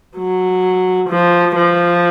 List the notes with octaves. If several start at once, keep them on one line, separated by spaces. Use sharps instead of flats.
F#3
F3
F3